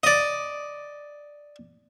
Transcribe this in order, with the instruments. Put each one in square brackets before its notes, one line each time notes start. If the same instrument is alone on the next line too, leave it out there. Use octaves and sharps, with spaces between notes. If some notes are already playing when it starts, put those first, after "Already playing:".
[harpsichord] D5 D#5